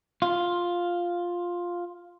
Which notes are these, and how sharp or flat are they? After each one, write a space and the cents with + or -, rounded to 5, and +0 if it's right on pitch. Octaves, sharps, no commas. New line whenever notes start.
F4 +5